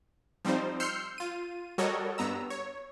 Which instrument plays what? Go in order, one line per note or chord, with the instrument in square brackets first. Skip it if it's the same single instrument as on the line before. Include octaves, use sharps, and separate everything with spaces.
[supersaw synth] F3 G3 C4 D#4 C5
C6 E6 F6 G6 C7 C#7
F4 D#7
G3 F#4 A4 A#4 C#5 D#5
G2 B3 A#5 E6
C#5